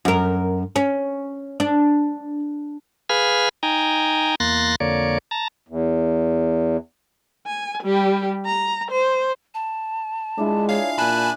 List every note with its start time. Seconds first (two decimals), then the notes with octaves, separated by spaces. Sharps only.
0.05 F#2 A#4
0.76 C#4
1.60 D4
3.09 G#4 B4 F5 G#5 B5 F6
3.63 D#4 G5 G#5 A#5
4.40 E2 A#3 C6 F#6 A6 A#6
4.80 F2 D3 A#3 C#5 D5
5.31 A5 A#5
5.68 E2
7.46 G#5
7.83 G3 G4
8.46 A#5
8.91 C5
9.54 A5
10.38 G#3 D4 E4 F4
10.69 G#4 C#5 F5 A#5
10.98 A#2 G#5 A5 B5 F#6